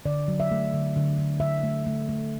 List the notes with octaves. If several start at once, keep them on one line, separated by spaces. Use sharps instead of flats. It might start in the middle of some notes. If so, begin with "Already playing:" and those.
D3 D5
F#3
E5
A3
D3
D3
D3
D3 E5
A3
A3
A3